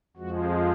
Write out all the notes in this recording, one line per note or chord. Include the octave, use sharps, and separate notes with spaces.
F2 F3 G#3 F#4